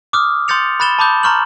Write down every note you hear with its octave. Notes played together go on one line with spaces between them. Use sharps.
D6 D#6 F6 F#6
C6 D#6 G6 A6 C#7 F7
B5 F#6 A6 E7 G7
A5 B5 D6 D#6 G6
A#5 C6 C#6 F6 G6 F#7